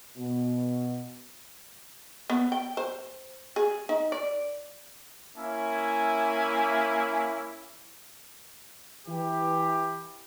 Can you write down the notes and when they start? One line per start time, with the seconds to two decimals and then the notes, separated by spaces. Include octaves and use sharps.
0.17 B2
2.30 B3
2.52 G5
2.77 C5
3.56 G#4
3.89 D#4
4.12 D5
5.36 A#3 C#4 E4 E5 G#5
9.07 E3 G4